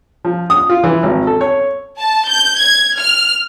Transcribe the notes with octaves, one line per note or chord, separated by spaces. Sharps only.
F3
D#6
F4
E3
G#1
A4
C#5
A5
G6
G#6
F6